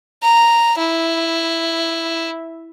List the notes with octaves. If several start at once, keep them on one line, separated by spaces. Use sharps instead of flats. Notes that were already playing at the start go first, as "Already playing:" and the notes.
A#5
E4